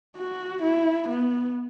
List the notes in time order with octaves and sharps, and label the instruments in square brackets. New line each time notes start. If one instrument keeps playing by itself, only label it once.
[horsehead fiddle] F#4
E4
B3